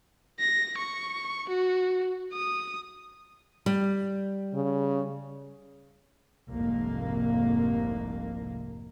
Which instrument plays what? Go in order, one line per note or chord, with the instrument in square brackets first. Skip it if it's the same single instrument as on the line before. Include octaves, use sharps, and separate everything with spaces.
[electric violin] A#6
C#6
F#4
D#6
[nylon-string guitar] G3
[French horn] C#3
[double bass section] F1 C2 F2 G#2 A#3